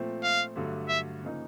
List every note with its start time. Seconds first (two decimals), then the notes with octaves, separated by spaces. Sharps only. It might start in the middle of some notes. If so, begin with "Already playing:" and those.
Already playing: A#2 F3 A3 C4
0.24 F5
0.56 G2 D3 F#3 A3
0.89 E5
1.22 C#3 F3 A#3 D#4